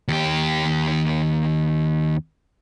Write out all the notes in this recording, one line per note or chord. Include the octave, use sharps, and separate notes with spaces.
D#2 G4